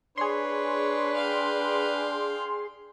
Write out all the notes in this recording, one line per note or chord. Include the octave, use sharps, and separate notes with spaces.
D4 G#4 B4 C#5 C6
F5 G5